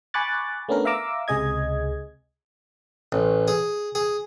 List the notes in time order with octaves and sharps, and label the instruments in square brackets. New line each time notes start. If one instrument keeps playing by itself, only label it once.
[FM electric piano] G#5 B5 C#6 D6 F#6 A6
A3 B3 C#4 D4 A#4
E5 F5 A#5 D6 E6
C#2 C3 G#4 D#5 G#6
[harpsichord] A1
G#4
G#4